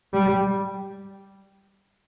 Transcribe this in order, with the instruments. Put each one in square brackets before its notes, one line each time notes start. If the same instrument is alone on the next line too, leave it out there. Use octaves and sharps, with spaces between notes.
[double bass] G3